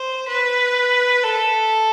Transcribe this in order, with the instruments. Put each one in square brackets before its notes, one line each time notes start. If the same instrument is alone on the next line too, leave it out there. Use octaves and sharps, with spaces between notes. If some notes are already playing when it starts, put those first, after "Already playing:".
Already playing: [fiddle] C5
B4
A4